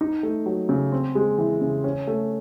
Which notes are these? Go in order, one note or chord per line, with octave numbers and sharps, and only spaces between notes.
D#4
A3
F#3
C#3
C4
G#3
E3
C#3
C#4
A3